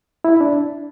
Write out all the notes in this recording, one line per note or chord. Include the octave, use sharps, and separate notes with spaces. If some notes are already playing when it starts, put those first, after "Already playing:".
E4
D4